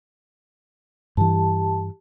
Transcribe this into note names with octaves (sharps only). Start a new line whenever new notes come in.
G2 E3 G4 A5